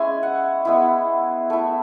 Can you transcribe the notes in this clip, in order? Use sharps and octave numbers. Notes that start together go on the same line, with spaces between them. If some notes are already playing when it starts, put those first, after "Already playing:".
Already playing: G#3 C#4 E4 G#5
F#5
G#3 B3 E4
A3 E4